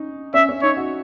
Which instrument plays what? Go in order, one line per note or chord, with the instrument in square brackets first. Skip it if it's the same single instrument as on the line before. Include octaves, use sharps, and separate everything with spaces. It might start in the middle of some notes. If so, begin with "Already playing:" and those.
Already playing: [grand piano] C#4 D#4
[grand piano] C#4 [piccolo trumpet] E5
[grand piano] C#4
[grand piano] D#4 [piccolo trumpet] C#5
[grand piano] F#4